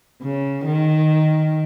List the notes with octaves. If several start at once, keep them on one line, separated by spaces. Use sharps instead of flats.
C#3
D#3